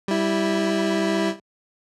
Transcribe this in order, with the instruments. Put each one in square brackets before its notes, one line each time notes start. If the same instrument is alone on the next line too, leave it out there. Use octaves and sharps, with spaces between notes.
[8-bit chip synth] G3 E4